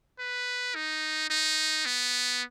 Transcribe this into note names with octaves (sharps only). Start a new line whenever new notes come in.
B4
D#4
D#4
B3